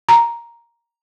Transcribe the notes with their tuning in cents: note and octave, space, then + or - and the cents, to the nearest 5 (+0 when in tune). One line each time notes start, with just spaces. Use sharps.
A#5 +5